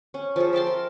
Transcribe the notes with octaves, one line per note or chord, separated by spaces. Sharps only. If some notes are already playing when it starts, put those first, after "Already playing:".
C#4
F3 G#4 A4
E5 G5 A5 C6
A#4